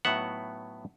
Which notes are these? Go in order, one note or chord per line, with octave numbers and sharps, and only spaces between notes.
A2 F#3 B3 D#4 E5 F#5